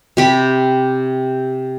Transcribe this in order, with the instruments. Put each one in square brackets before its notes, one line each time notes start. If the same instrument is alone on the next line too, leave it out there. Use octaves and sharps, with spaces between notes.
[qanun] C3 G4 B5